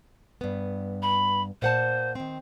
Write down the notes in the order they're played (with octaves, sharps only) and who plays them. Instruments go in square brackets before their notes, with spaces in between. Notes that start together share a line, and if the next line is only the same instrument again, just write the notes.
[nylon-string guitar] G2 B3
[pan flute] B5
[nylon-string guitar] A#2 F#5 A5 [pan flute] C5
[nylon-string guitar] D#3 C4